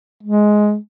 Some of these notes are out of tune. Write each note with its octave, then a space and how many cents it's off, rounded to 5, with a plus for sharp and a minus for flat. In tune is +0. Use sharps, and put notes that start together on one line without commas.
G#3 +10